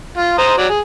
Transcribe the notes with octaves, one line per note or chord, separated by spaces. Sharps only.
F4
C5 A#5 D#6
F#3 D5
G#4